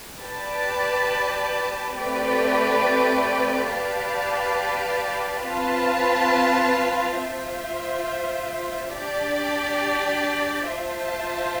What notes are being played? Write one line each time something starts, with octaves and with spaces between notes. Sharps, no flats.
G4 B4 D5 A5
A3 C4 G4 B4 D5
G4 B4 D5 F5 A5
C4 F4 B4 F5 A5
F4 C5 E5
D4 G4 D5
F4 C5 E5 A5